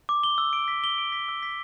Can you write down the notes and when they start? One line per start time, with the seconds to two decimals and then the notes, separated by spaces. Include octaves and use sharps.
0.09 D6
0.23 G7
0.38 E6
0.53 D7
0.68 B6
0.84 G7
0.98 D7
1.12 B6
1.28 E6
1.43 B6